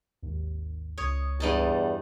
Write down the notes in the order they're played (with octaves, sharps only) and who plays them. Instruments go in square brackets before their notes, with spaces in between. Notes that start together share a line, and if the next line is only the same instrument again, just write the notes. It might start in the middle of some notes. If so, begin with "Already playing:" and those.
[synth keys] G#1 D#2
[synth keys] C#2 D#6 [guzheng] C#5
[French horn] E2 [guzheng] G2 D#4 A5